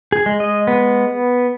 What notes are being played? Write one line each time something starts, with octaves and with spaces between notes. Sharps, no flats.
G#4
G#3
D#5
B3